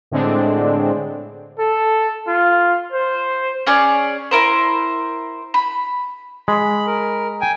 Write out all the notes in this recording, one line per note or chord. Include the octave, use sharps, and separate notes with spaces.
A2 D3 G#3 C4 D4
A4
F4
C5
C#4 G#4 C#5 D5
E4 A#4 C5
B5
G#3 B5
A#4
G5 G#5